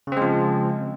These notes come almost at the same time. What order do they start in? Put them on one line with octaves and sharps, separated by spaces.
C#3 C4 G#3 F3